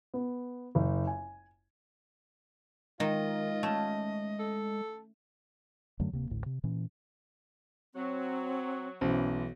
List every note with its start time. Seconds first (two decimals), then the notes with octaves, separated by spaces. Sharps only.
0.14 B3
0.75 F#1
1.07 G#5
3.00 D#3 G#3 F4 D#5
3.63 A3 C#4
4.40 A4
6.00 F#2 D3 F#3 A3
6.12 D1 C3 A#3
6.30 A1 D2 A2
6.46 C3
6.64 A#2 E3 C#4
7.95 F#3 C4
9.01 B1 E3 C#4 C5